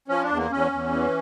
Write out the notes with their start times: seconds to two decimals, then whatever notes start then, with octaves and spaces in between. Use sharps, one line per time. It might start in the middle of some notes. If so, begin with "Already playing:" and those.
0.08 F3 C#4
0.23 D4
0.29 E2
0.37 A#3
0.51 E2 C#4
0.72 E2
0.92 E3